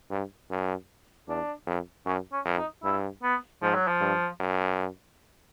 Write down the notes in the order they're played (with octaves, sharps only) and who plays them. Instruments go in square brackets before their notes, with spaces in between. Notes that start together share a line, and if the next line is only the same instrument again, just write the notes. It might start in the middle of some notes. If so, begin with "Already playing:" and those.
[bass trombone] G2
F#2
[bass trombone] E2 [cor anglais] D4
[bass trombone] F2
[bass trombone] F#2 [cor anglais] C#4
[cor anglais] C#4
[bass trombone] F2
[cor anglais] D#4
[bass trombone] G2 [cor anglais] E4
[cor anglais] B3
[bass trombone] G#2 [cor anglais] F3
[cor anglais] F#3
F3
[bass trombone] G2
F#2